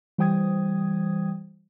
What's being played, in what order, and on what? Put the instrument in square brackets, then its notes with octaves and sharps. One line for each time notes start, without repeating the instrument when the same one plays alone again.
[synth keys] E3 G3 C5 G5 D#6 G#6